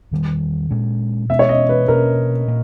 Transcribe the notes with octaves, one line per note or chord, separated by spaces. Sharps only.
E2 D#3 G3
A#2 G#3 C#4
B2 G#3 B3 E5
C#5
D#5
B4
B2 A#3 C#4 A#4
A#2 A#3